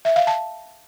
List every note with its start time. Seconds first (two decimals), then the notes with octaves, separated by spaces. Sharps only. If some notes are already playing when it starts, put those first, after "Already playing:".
0.05 E5
0.16 F5
0.27 A5